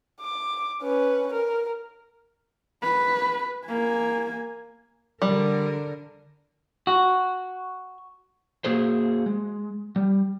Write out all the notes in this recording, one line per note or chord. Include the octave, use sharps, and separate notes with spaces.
D6
C#4 B4
A#4
B4
A#3 G#5
D3 G3 A#4
F#4
A#3 F#4 G#4 C5
G#3
G3